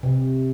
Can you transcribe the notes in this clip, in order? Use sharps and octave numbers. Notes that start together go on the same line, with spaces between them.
C3